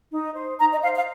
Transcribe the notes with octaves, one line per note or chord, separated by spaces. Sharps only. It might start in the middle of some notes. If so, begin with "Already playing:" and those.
D#4
C5
D#4 A#5
D#5
C5 F5
F5